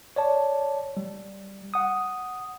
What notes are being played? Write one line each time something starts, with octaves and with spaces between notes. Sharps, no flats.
C#5 D5 A5
G3
F#5 D#6